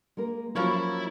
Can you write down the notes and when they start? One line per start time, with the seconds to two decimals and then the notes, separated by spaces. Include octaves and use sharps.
0.17 G#3 A#3 A#4
0.56 F3 F#3 A#3 C#4 E4 A#4 C#5 B5